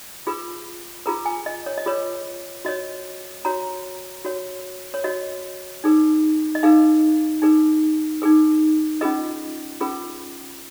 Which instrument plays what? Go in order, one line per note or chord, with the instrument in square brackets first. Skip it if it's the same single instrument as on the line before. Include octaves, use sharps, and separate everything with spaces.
[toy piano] F4 G#4 B4
F4 G#4 B4 A#5
G#5
D#5
C#5
D#5
F4 G#4 B4 C#5
F#4 C#5 D#5
F#4 C#5 A#5
F#4 C#5
C#5
F#4 C#5 D#5
D#4 G#4 B4
D#5
D#4 G#4 B4 F5
D#4 G#4 B4
D#4 G#4 B4
C#4 F4 G#4 B4 D#5
C#4 F4 G#4 B4